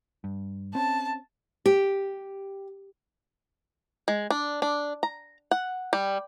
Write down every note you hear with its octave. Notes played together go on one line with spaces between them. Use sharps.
G2
C4 C#4 A5
G4
G#3
D4
D4
A#5
F#5
G3